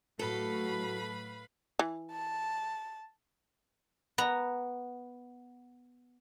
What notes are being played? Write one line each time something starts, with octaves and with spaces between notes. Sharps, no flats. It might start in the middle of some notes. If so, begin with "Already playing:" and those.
A2 F#3 F#4 A4 B4 F5 B5
E3
A5
B3 A#5